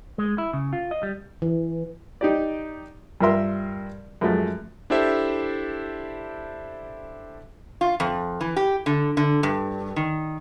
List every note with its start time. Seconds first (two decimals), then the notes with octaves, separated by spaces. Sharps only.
0.18 G#3
0.38 E4
0.53 C#3
0.73 F4
0.91 D#5
1.03 G3
1.42 E3
2.21 D#4 G4 D5
3.21 G2 F4 A#4 E5 C6
4.21 F#2 F3 G#3 A3
4.90 D4 E4 G4 A4 C5 E5
7.81 F4
8.00 F2
8.41 E3
8.56 G4
8.86 D3
9.17 D3
9.43 G2
9.96 D#3